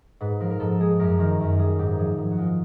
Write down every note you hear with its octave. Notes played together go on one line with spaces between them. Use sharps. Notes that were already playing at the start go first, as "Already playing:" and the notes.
G#2 B4
F3 A#4
A#4
G#2 A4
G#3 G#4
F#2 A#4
D#3 A#4
F#2
G3 G#4
G#2 G4
F3 G#4
G#2
F#4
G#3 F4